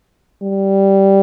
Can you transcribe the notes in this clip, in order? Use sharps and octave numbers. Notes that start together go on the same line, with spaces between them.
G3